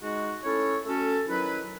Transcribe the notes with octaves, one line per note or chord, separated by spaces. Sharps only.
G#3 D#4 F#4
A3 C#4 E4 A4 C#5
A3 C#4 F#4 A4
D#3 F#3 C#4 E4 B4